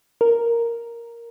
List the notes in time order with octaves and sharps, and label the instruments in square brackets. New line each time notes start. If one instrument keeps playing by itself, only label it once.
[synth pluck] A#4